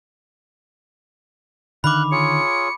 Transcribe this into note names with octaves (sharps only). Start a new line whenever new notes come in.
D3 D#3 F5 B5 D6 F#6
F4 G#4 C#5 C#7